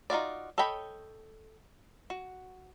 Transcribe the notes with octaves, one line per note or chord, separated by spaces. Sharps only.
D#4 F4 F#4 D5
A4 C#5 D#5 G5 B5
F#4